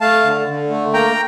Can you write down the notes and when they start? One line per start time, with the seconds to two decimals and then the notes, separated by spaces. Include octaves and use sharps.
0.01 A3 F5 A5
0.24 D3
0.48 D3
0.70 A3
0.94 A#3 G5 A#5